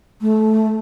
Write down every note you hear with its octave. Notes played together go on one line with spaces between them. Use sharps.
A3